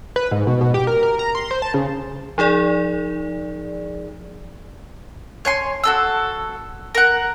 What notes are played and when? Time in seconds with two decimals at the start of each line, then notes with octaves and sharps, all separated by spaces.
0.16 B4
0.31 G#2
0.47 B2
0.61 B2
0.74 G4
0.87 A#4
1.03 A#4
1.19 A#5
1.35 C6
1.51 C5
1.62 A5
1.74 C#3
2.38 F3 D#4 G#4 D5
5.45 C#5 G#5 C6
5.83 F#4 A4 E6
6.95 A#4 F#5